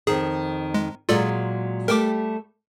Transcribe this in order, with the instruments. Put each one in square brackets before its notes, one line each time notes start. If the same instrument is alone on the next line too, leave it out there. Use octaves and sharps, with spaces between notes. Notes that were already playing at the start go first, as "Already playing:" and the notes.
[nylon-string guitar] F2 D#3 [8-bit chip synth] G#4
[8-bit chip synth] G#3
[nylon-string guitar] A#2 F#3 G#3 [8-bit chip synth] F4 A4 D5
[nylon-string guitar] G3 A3 G4 [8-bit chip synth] A#4 G5 D6